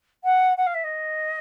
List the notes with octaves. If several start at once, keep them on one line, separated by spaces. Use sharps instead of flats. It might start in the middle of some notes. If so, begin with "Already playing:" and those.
F#5
F#5
F5
E5
D#5